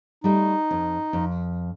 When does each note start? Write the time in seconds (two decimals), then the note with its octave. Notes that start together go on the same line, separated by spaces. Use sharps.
0.24 G3 A3 D#4
0.71 F2
1.13 F2